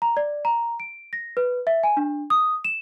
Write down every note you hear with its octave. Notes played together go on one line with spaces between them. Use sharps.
A#5
D5
A#5
D7
A#6
B4
E5
G#5
D4
D#6
E7